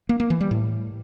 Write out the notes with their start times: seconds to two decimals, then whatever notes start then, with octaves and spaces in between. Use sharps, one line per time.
0.09 A#3
0.20 A#3
0.30 E3
0.41 G3
0.51 A2